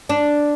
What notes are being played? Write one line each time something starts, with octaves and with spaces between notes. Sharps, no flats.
D4